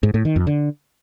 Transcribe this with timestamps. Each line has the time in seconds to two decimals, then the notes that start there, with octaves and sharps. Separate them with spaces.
0.03 G#2
0.14 A2
0.25 D#3
0.36 F2
0.47 D3